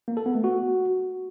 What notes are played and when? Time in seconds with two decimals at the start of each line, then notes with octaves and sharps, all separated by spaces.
0.08 A#3
0.17 A4
0.26 B3
0.35 A3
0.44 F#4